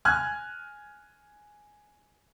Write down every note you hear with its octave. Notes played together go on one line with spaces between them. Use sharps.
G#5 F6 F#6 G#6